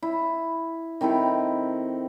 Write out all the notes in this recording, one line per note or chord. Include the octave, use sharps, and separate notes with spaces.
E4
D#3 C4 E4 A4